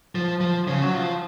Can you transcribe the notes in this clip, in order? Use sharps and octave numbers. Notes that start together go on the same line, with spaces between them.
F3
F3
C#3
F#3
F3